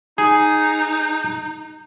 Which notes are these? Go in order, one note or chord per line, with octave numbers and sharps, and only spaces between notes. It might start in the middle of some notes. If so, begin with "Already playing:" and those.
D#4 G#4